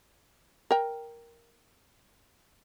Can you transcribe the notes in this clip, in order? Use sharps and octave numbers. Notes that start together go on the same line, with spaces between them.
A#4 G5